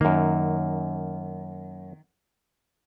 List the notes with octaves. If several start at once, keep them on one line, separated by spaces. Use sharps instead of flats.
F#2 D#3 A#3